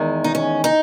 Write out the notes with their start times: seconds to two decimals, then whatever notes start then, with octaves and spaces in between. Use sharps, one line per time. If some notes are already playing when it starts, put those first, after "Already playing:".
Already playing: E2 D#3 G#3
0.24 D#4
0.35 C#4
0.64 D#4